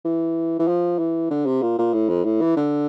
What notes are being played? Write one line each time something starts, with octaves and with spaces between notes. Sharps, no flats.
E3
E3
F3
E3
D3
C3
A#2
A#2
A2
F2
A2
E3
D3